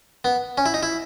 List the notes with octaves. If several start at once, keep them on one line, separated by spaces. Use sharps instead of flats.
B3
C#4
E4
D#4
E4